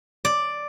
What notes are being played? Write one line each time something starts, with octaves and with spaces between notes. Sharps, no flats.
D5